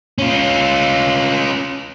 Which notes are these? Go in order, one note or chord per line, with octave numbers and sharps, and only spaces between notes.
C#4 F4